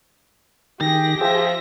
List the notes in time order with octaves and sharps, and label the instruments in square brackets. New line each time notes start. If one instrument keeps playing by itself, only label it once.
[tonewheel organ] D#3 [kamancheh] G4 G5 [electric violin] G#4 A#6
[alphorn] F3 [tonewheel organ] G#4 [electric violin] E5 A#6